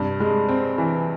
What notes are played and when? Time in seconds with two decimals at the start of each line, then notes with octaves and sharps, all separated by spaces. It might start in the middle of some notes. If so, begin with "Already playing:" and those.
Already playing: G2 C3
0.20 G#3
0.49 C4
0.78 E3